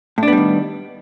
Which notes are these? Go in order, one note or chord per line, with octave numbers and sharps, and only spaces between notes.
A2 D#3 G3 B3 D4